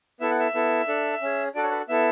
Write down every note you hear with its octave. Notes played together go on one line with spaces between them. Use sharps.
B3 E4 A4 E5
F#5
E5
B3 E4 A4
D4 A4
C#4 G#4
D4 F#4 A4 D5
C#5
B4
B3 E4 A4 E5